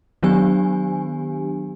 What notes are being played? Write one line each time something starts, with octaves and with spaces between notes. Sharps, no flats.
D#3 F#3 B3 D4 G4 G#5